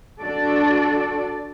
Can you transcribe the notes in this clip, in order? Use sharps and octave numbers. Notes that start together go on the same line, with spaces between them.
D4 F#4 A4 D5